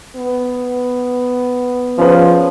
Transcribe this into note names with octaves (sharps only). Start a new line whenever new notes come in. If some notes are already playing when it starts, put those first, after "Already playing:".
B3
F3 C#4 G#4 B4